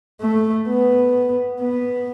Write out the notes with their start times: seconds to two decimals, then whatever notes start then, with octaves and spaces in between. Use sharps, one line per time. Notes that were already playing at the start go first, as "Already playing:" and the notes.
0.21 A3
0.68 B3
1.61 B3